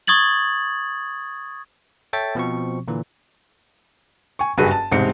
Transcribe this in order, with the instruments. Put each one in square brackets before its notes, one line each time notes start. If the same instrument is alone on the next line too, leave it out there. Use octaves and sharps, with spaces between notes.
[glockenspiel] C#6 D#6 G#6 A6 F#7
[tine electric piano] A4 C#5 E5 G5 A6
B2 F3 C4 C#6
A#2 D3 E3
[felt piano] G#5 C#6
F#1 G2 F#4 G#4 B4 D#7
A5
E1 C2 G#2 C4 G4 C#7